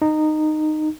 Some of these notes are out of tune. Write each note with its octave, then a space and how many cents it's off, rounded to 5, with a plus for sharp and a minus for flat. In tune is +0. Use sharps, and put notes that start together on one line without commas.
D#4 -15